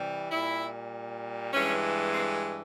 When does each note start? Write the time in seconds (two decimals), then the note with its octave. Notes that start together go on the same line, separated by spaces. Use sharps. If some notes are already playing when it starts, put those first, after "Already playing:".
Already playing: C3 E3 G3
0.32 A#2 G3 E4
1.53 G2 E3 G#3 C#4
2.13 C4